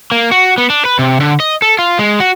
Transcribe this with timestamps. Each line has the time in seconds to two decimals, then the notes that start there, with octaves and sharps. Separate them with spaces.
0.12 A#3
0.31 F#4
0.58 B3
0.70 D4
0.85 B4
0.99 C3
1.20 D3
1.40 D#5
1.62 A4
1.79 F4
1.99 G#3
2.20 F#4